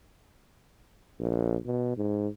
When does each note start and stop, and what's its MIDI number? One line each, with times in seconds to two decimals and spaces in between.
1.19 1.56 34
1.66 1.94 47
1.97 2.28 44